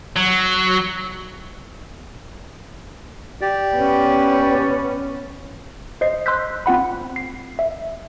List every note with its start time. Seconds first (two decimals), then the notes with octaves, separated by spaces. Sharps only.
0.16 F#3
3.41 G4 D5
3.76 B3 C#4
6.01 C5 D#5 C7
6.26 C6 E6 F#6 G6 B6
6.66 C4 F4 F#5 B5
7.16 C7
7.59 E5